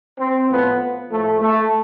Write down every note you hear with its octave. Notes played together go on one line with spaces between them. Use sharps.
C4
A2 F3 B3
A2 F3 A3
A3